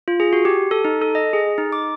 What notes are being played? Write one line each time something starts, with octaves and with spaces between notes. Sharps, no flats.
F4
G#4
F#4
G4
A4
D#4
A4
D#5
G#4
D#4
D6